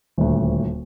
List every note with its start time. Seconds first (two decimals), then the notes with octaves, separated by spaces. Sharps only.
0.18 D#1 D2